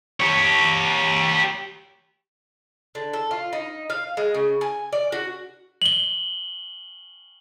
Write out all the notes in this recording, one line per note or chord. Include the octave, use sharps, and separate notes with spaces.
G4 C#5
D3
A4
F4
D#4
F5
G#3
C#3
G#5
D5
F#4
F#7 G7